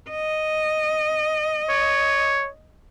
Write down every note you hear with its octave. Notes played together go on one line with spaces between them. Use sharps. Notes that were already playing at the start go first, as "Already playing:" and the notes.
D#5
C#5